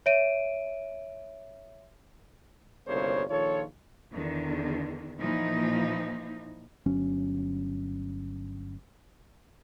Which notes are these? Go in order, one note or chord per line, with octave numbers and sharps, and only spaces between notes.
C#5 E5 D7 D#7
G1 C2 C#3 A#3 C5 C#5
A#1 D#3 F4 A4 C#5
E2 D3 D#3
A#2 E3 F3 D#4
G1 F#3 C#4